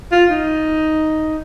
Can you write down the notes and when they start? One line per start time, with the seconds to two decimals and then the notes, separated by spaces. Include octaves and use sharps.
0.12 F4
0.30 D#4